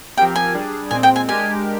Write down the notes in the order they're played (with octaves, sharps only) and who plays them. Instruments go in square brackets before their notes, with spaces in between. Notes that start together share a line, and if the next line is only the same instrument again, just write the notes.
[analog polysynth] F3 C4 G4 A#4 [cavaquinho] G5
[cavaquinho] G#5
[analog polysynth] G3 D4 G#4
[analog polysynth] A#2 G#3 C4 [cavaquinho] G#5
[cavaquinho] G5
G#5
[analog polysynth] G#3 D4 G4 A#4 [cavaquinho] G#5